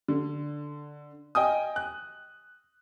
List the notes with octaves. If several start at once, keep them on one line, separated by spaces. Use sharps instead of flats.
D3
D#5 G5 G#5 D#6
F#6